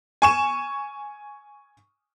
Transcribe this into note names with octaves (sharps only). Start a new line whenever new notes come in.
G#5 C#6 E7